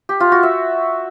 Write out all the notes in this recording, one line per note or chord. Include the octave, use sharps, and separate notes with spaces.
G4
F4
F#4
E5